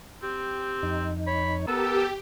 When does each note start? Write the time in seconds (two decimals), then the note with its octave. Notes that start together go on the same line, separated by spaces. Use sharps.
0.23 C4 G4
0.83 F2 D#4
1.27 C#5 B5
1.67 B3 G4 A4 A#4 E6